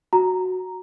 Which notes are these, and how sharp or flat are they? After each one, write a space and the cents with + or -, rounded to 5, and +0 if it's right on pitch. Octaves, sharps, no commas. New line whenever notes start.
F#4 -5 A#5 +0